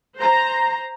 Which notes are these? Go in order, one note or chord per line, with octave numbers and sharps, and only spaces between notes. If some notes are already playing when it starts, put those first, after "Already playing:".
C5 A#5